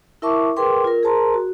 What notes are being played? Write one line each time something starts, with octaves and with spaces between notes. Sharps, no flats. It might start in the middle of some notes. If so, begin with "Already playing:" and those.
E4 A#4 E5 A5 C#6 D6
G#4 A#4 B4 G5 C6 D6
F4 A#4
G#4 A#4 C5 A5 A#5 C6
F#4